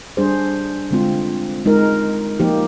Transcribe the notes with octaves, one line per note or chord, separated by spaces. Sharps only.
G3 D4 G#4 C5
D3 G#3 C4 F4
G#3 D#4 A#4
F3 A#3 D#4 G4